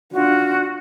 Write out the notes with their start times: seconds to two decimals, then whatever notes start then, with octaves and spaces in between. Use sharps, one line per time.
0.13 D4 F4 F#4